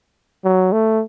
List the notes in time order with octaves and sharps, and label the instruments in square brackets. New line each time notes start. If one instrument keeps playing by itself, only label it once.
[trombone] F#3
A3